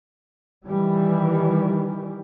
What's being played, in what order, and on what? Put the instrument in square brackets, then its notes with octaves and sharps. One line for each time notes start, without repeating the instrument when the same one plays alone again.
[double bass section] D#3 E3 G3